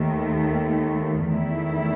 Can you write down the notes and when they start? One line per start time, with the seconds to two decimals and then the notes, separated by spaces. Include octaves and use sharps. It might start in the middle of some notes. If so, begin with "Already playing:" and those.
Already playing: D#2 D#3 A3
1.30 E2 D#3 A3 E4